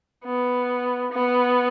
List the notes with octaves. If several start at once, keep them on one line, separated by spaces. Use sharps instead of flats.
B3
B3